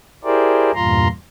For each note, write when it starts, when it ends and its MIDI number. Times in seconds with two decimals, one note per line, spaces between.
0.25 0.71 64
0.25 0.71 67
0.25 0.71 68
0.25 0.71 70
0.25 0.71 72
0.25 0.71 74
0.75 1.08 40
0.75 1.08 43
0.75 1.08 46
0.75 1.08 65
0.75 1.08 82
0.75 1.08 84